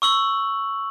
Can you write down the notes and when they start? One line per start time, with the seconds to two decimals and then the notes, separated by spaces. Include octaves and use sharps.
0.02 C#6 E6 F#7